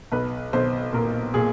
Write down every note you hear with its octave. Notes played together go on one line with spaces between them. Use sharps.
B1 B4
B1 C5
A#2 A#4
A#2 G#4